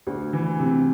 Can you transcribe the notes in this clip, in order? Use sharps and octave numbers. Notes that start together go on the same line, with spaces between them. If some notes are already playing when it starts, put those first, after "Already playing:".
D2
E3
C3